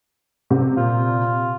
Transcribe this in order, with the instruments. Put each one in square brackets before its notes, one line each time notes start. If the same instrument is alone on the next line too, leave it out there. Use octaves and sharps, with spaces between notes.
[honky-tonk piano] C3
[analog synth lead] A#2 [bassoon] F4